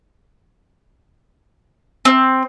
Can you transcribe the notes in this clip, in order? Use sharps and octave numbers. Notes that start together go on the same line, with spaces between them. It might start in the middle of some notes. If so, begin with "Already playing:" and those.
C4